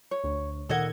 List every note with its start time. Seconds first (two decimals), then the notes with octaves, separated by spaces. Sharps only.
0.11 C#5
0.24 D2
0.69 A#2 D#3 A4 D#5 F#5 G#6